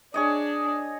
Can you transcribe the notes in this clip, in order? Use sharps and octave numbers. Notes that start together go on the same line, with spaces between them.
D4 G#4 C#5 D#5